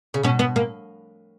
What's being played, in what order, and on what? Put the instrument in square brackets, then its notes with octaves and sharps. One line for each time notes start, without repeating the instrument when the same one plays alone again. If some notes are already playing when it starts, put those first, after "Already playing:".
[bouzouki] C#3
[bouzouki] B2 [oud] C#4
[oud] B3
A#3